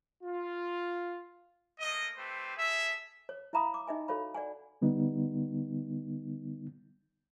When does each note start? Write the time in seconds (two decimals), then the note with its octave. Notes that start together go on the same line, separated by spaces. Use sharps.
0.23 F4
1.80 A3 A#3 D#5
2.17 A3 C4 G4 B4 C5
2.56 G#4 A4 E5
3.29 C#5
3.53 E4 E5 F5 A#5 B5 D#6
3.74 D6
3.88 D#4 D#5 E5 G#5
4.08 F#4 A4 C#5 F5 B5
4.35 D5 F#5 G#5
4.82 D3 G3 B3 D#4